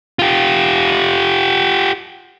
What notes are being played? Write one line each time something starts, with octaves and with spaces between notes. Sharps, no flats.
F4 G4